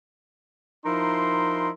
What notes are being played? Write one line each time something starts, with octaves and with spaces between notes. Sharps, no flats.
F3 D#4 E4 A#4 C6